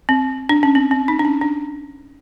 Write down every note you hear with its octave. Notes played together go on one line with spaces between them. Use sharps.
C4
D4
C#4
C4
C4
D#4
D4
C#4
D4